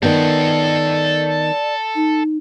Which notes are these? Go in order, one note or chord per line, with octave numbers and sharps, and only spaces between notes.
D#3 B3 A4 D5 G5
D#4